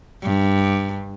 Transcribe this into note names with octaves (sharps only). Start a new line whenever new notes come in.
G2